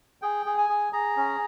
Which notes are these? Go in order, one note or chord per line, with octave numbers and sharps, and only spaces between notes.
G#4 G5
G#4
G#5
G#4
G#4 A#5
C#4